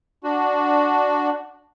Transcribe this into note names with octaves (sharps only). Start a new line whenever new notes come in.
D4 F#4